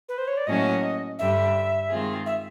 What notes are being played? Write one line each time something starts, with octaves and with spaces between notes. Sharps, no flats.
B4
C5
C#5
D5
A2 F#3 A#3 C#4 F#4 D#5
G2 D3 G3 E5
D#3 G#3 C4 F4 G#4
E5